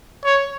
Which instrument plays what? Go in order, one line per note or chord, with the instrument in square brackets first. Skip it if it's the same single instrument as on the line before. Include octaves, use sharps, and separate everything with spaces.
[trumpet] C#5